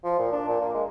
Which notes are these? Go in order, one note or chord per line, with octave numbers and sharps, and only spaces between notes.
F3
A#2
D4
A#2
A#3
G#3